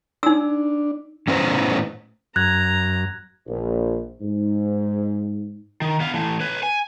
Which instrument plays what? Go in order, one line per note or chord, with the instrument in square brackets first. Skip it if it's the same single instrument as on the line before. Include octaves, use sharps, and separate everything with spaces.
[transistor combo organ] D4 [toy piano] D#4 E6
[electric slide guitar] A2 C#4 B4 C5 D#5 A#5
[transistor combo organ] F#2 [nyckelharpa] A#5 [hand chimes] F#6 G#6
[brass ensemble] A#1
G#2
[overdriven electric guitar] D#3
B3 F5
E3 A3
B4 C#5
G#5